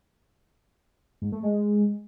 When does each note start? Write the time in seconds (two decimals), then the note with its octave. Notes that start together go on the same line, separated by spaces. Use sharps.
1.22 G#2
1.32 A3
1.43 G#3